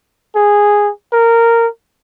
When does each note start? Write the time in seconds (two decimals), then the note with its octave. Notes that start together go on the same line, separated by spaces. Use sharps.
0.36 G#4
1.13 A#4